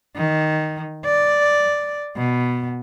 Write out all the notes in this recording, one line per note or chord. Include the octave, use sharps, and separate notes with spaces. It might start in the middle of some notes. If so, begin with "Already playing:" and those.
D#3
D5
B2